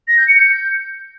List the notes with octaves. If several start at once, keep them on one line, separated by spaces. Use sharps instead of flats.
A#6
G6
C#7
G6